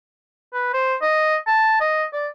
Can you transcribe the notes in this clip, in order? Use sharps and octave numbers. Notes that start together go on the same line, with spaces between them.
B4
C5
D#5
A5
D#5
D5